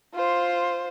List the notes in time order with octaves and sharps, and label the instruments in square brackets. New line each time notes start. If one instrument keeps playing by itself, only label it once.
[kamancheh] F4 C5